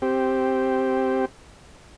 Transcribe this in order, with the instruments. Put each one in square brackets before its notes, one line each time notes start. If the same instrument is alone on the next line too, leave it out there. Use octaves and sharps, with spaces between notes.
[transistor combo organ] C4 G4